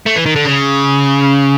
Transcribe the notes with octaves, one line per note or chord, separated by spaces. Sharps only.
A3
E3
D#3
D3
C#3